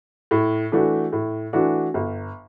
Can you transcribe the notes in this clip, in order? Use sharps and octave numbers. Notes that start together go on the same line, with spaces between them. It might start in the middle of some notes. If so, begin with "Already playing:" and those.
A2
E3 A3 D4 F#4
A2
E3 A3 D4 F#4
G1